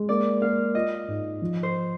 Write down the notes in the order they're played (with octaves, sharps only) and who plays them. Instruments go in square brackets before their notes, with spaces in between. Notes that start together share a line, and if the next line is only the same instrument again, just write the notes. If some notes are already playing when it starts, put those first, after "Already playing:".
Already playing: [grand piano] G#3
[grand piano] A#3 [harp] D5
[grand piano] A#3 [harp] F5
[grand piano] F4 [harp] D#5
[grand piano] G#2
F3
[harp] C5